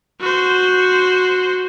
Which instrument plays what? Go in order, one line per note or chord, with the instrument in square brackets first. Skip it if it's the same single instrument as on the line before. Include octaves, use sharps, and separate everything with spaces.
[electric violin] F#4 C5